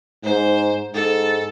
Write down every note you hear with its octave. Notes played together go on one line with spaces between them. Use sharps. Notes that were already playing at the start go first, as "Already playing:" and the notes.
G#2 C5
G#2 A4